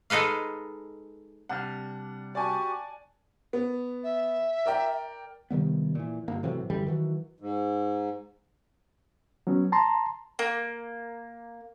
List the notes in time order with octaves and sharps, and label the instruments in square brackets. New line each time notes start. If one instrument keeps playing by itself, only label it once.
[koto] G#3 D#4 A4 B4 F5
[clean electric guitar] C3 G3 D4 [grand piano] F#5 F6
[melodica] F#4 G4 [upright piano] D5 G#5 A5
[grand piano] B3
[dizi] E5
[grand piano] A#4 D5 G5
[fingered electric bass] C3 D#3 G3 B3
A#2 E3
G1 A#3
A2 C3 E3 F#3
F#2 D3 E3 G3
D#3 E3 F#3
[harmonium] G#2
[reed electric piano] F#3 B3 C#4
A5 A#5 C6
[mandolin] A#3